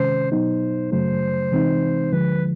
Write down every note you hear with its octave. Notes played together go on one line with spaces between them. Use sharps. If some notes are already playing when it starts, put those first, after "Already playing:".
Already playing: C3 D#3 G#3 C#4 C5
B2 F#3 B3 D#4 C5
F#2 C#3 F#3 A3 C5
C3 E3 G#3 C4 D#4
D2 D3 F3 G#3 B4